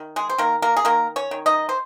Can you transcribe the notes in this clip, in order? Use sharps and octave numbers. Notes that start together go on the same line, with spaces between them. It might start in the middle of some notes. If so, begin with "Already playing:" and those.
Already playing: D#3
G#3 G#4
C5
D#3 A#3 A#4
A#3 A#4
G#4
D#3 A#3 A#4
C#4 C#5
D#3
D#4 D#5
C5